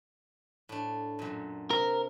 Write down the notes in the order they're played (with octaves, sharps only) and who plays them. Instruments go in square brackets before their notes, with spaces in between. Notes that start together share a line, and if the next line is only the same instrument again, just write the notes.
[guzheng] A2 D4
F#2 A#2
[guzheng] C3 [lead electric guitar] A#4